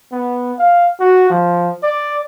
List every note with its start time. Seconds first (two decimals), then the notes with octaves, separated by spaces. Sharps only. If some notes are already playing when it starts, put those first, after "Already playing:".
0.12 B3
0.59 F5
1.00 F#4
1.30 F3
1.83 D5